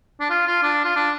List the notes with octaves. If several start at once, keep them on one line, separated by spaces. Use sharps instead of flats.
D4
F4
F4
D4
F4
D4